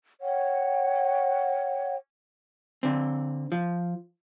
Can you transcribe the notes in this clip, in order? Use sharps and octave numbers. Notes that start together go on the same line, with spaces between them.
C#5 F#5 G5
D3 C4
F3